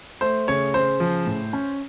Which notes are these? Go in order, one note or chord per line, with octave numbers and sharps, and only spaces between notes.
A3 C5
C#3 C#5
C#3 C5
F3
A2
C#4